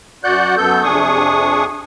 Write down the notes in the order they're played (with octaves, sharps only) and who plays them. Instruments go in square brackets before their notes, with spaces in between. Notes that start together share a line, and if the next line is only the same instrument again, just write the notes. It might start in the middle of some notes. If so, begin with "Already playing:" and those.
[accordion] F#2 F#4 D5 F#5 F#6 G6
F#2 B3 A4 G6
F2 C3 D4 G#4 C#6 D#6